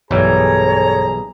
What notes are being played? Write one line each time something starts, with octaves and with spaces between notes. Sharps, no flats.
B1 G2 E3 G3 G#4 A4 C#5 A#5